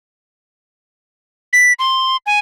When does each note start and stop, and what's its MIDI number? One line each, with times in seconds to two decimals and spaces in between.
1.53 1.73 95
1.79 2.17 84
2.26 2.39 80